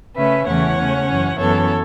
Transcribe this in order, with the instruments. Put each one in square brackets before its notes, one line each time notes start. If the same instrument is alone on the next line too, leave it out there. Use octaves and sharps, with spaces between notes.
[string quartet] C#3 A3 C#4 B4 E5
E2 C#3 E3 A3 C#4 C#5 F#5
C#3 A3 C#4
F#2 E3 C#4
F#2 E3 B3 A4 C#5